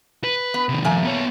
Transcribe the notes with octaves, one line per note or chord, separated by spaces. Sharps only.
B4
B3
C3 D#3
D#2 A#2 F3 A3 G#5
B3 C#5